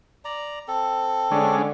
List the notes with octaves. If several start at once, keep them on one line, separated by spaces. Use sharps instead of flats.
D5 A#5
C4 A4
D3 G#3 C#4 D4